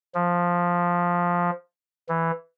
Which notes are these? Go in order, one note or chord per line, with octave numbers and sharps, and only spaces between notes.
F3
E3